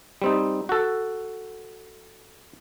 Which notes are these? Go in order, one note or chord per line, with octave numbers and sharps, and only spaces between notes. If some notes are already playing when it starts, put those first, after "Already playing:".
G3 C4 D#4
F#4 A4